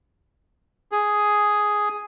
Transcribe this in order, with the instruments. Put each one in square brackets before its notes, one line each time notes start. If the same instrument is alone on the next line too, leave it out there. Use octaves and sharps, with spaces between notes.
[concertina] G#4